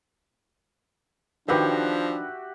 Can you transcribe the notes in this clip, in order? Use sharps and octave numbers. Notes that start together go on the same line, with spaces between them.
D#3 F3 D4 F#4 G4 B4 E5